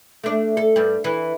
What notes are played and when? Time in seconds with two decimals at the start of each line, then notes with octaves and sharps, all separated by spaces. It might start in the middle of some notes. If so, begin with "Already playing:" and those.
0.24 A3 D4
0.57 A4
0.76 G2 G3
1.04 E3